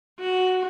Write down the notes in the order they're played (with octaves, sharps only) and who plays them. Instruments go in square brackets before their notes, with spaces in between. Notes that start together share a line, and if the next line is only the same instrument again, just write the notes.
[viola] F#4